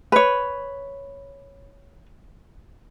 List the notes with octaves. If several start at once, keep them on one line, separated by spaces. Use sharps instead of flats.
B4 C#5